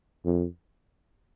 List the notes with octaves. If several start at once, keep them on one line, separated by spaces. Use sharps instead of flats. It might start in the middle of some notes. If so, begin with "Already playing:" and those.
F2